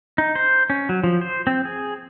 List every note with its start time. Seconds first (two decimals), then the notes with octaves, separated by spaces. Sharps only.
0.18 D#4
0.35 C5
0.70 C#4
0.89 F#3
1.04 F3
1.21 C5
1.47 C4
1.65 G#4